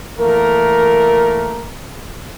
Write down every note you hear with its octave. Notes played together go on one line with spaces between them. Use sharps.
E3 A3 A#3 A#4